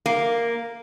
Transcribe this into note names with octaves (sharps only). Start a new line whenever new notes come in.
A#3